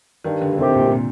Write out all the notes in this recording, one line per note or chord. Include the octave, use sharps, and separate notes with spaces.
G2 D#3
D3
D3
C3 D#3 A3 C4 G4
C3
A#2
C3
A#2